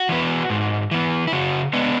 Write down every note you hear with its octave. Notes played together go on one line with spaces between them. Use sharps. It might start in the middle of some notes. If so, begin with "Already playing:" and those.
Already playing: F#4
E3 B3
G#2
E3 B3
E4
C#3 F#4
G#3 B3 D4